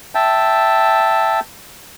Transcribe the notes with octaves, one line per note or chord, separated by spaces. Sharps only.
E5 G5 A5